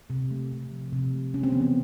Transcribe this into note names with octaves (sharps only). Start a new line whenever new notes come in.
C3
A3
C3
F3
C3
A3
C#3 C#4
C4
E3 B3
C4